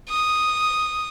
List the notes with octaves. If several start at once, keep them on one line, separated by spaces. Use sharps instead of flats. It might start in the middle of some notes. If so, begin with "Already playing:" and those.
D#6